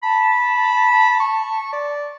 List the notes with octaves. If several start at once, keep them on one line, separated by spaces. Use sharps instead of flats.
A5 B5
C#6
D5